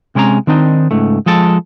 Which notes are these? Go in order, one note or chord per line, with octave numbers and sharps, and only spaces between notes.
C3 G#3 C#4 G#4 A#5
D#3 C4 D4 D#4
C#2 G#2 A3
F3 G#3 A4 A5